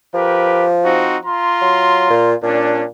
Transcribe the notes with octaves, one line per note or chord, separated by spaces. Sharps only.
F3 G4 A#4 B4
C4 D#4 F#4
F4 A#5 C6
F#3
A#2
A#2 C#4 D4